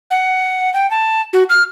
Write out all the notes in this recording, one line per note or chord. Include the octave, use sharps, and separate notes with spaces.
F#5
G5
A5
F#4
F6